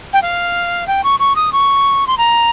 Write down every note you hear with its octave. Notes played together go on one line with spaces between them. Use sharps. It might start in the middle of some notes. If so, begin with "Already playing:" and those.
G5
F5
G5
C#6
C#6
D#6
C#6
C6
A#5